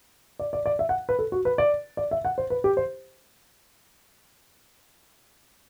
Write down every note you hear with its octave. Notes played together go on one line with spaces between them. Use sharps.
D5
D5
D5
E5
F#5
B4
A4
F#4
B4
D5
D5
E5
F#5
C5
B4
G4
C5